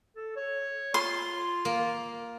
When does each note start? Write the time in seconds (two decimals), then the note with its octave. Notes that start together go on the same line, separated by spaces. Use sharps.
0.17 A4
0.36 C#5
0.94 F4 C6
1.65 A#3